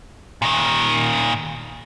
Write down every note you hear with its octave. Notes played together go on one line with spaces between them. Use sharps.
A#2 D#3